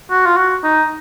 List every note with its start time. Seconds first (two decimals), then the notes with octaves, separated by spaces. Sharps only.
0.10 F#4
0.26 F4
0.37 F#4
0.63 D#4